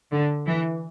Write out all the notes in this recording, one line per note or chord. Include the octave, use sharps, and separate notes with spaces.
D3
E3